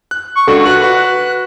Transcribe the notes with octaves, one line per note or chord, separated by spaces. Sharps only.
F#6
C#6
C#2 D4 F#4 A4
F#4 B4 C#6 F#6
F#4 B4